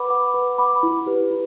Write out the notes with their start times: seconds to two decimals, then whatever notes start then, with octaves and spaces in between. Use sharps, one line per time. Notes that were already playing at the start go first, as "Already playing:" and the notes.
Already playing: B4 F#5 B5 D6
0.10 F#5 B5 D6
0.34 B4
0.58 F#5 B5 D6
0.83 E4
1.06 G4 B4
1.31 E4